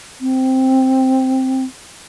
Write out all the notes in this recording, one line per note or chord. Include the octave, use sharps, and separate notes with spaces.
C4